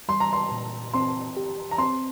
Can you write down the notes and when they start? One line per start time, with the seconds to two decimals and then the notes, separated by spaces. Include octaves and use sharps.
0.08 G3 C6
0.20 A#5
0.33 C6
0.51 A#2
0.94 C4 C6
1.36 G4
1.71 A#5
1.78 C4 C6